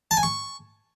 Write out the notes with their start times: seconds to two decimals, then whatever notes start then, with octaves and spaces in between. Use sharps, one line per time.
0.11 A5
0.17 G#5
0.23 C#6